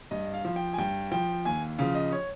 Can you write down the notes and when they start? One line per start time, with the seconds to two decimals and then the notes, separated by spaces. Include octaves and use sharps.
0.11 G2 D#5
0.34 F5
0.45 F3
0.56 G5
0.73 G#5
0.78 G2 G5
1.11 F3 G5
1.45 D#2 G#5
1.78 C#3 F3 F5
1.95 D#5
2.12 C#5